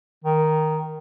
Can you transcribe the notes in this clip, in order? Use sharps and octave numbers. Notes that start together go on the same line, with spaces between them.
D#3